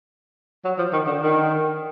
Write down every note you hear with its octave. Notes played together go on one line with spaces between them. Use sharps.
F#3
F3
D#3
D3
D#3